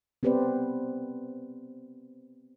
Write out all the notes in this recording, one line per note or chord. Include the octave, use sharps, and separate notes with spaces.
B3 C4 G4 B4 C5 D5